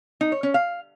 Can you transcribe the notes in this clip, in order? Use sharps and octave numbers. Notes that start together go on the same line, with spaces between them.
D#4
C#5
C#4
F5